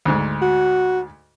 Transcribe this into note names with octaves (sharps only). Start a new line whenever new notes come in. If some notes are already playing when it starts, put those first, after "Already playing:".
D2 G#2
F#4